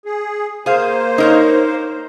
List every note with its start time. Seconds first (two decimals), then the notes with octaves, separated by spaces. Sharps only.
0.05 G#4
0.66 A#3 G#4 C5 F5
1.18 D#4 A#4 C#5